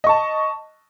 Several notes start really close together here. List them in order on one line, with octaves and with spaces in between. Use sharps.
D#5 C#6 A5